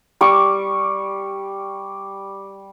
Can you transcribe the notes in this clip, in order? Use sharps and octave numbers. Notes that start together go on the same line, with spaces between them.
G3 C#6 D6